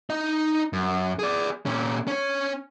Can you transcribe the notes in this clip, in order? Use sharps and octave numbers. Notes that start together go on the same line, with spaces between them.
D#4 D#5
F#2
G#4 D5
A#2 C#4
C#4 C#5